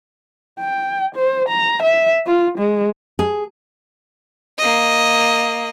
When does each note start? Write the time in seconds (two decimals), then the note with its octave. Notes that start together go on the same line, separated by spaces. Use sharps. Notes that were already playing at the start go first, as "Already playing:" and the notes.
0.60 G5
1.16 C5
1.49 A#5
1.83 E5
2.27 F4
2.59 G#3
3.19 G#4
4.58 A#3 D#5